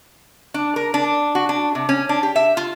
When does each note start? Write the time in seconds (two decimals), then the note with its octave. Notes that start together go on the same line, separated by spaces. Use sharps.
0.54 D4
0.76 A#4
0.94 D4
1.35 F#4
1.49 D4
1.75 C3
1.89 C#4
2.09 D4
2.23 G4
2.36 E5
2.57 F4